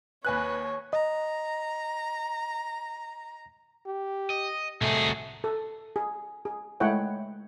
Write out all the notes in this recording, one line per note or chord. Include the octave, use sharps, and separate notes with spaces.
D#2 B4 C#5 G#5 F#6
D#5 A#5
G4
D#5
C2 A3 D#4 F#4 G#4
A4
G#4
G#4
G#3 A3 E4 C#5 F#5 G5